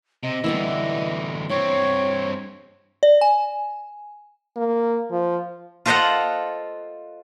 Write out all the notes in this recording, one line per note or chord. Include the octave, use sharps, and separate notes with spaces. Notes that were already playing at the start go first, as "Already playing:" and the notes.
C3 D#5
D3 E3 G3 B3 E4
G2 C4 C#5
D5
G#5
A#3
F3
F4 A4 C5 D#5 F5 F#5